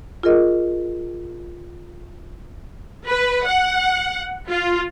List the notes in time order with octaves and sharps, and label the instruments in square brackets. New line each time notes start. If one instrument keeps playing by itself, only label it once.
[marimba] F4 G#4 A#4 D#5
[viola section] B4
F#5
F4